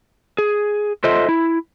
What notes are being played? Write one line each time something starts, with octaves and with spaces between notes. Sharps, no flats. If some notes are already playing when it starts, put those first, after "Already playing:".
G#4
F4 A4 C5 D#5 E5
E4